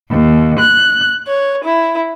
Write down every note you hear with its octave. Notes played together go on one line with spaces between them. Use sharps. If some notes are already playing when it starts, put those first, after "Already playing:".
D#2
F#6
C#5
E4